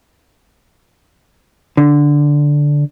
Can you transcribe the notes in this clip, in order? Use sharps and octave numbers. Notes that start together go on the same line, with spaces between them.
D3